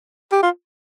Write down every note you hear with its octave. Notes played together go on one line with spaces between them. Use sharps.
G4
F4